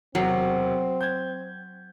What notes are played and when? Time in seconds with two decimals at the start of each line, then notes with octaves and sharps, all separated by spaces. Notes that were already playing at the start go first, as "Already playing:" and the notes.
0.15 E1 C3 F#3 C4 C7
1.01 G6 G#6